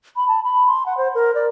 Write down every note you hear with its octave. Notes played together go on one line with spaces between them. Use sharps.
B5
A5
B5
C6
F#5
C5
A#4
D5